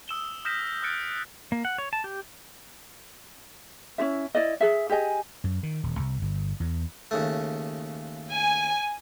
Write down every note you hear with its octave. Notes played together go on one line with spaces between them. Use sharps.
D#6 E6 E7 G7
D#6 F6 G6 A#6 B6 E7
D#6 F6 F#6 A6 C#7 D7
A#3
F#5
C#5
A5
G4
C#4 E4 F4 E5
E4 D5 D#5
G#4 E5
G4 G#4 D#5 G#5
F#2
D#3
D#1
C2
G1
E2
D#2 C#3 A3
G#5